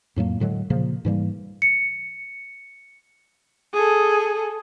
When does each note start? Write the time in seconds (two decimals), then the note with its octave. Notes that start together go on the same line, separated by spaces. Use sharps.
0.16 F2 A2 F#3 A#3
0.40 A2 D3 F#3 G#3
0.70 A#2 C#3 F3 A#3
1.05 G#2 E3 G3 A#3
1.62 C#7
3.74 G#4 A4